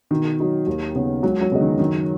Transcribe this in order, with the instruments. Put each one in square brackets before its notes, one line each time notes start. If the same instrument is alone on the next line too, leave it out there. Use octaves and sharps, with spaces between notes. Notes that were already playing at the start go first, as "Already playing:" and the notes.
[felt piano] B2 [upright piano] D#3
[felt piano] F#3 D#4 F#4
D#2
C#3 B3
[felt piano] C#2 [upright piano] F#3
[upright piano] F#3
[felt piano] C#3 B3 G#4 D#5
[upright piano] D#3
[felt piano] F#2 [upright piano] D#3